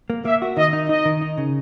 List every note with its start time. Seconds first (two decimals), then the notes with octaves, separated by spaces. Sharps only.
0.10 A#3
0.25 A#3 E5
0.42 F#4
0.57 D#3 D#5
0.73 D#4
0.89 D#4 D#5
1.05 D#3
1.22 D#4
1.38 C#3